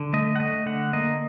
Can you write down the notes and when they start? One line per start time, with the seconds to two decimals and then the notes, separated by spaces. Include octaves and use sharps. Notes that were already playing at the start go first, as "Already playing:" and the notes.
Already playing: D3
0.13 A3 D#5
0.36 F#5
0.40 A3 D#5
0.66 D3 F#5
0.93 A#3 D#5